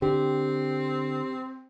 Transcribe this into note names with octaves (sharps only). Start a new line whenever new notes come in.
D3 C4 G4